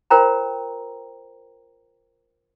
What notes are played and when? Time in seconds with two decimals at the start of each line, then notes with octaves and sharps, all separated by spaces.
0.10 F4 A#4 C5 G5 A#5